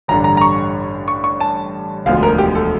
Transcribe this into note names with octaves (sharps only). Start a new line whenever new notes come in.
A1 G2 D3 A#5
A#5
A#5
C#6
C#6
C#6
A5
E1 D2 D3 F3 F5
A#4
G4
A4